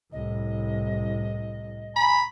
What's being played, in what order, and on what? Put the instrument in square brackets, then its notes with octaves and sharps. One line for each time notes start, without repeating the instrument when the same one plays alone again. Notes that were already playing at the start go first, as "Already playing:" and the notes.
[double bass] C2 A2 [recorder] D#5
[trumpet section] G#5 A#5 [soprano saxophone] B5